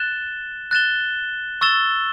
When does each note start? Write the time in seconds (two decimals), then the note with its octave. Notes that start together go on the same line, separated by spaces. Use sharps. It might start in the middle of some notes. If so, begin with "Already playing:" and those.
Already playing: F#6 A6 E7 G7
0.71 F#6 A6 E7 G7
1.61 C#6 E6 A6 E7 G7